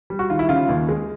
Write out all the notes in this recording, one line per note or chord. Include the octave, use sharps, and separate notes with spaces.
G3
F#4
D#3 F4
E4
C#3 F4
D#2
G#3